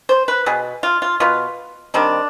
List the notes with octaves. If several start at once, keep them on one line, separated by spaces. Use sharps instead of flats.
C5
B4
B2 B3 G#4
F4
F4
B2 B3 F4
D#3 G3 C4 D4